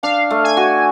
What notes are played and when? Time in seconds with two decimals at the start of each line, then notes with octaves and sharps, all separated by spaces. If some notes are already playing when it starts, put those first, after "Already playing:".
0.03 D4 F5
0.30 A3
0.44 G#5
0.57 F#4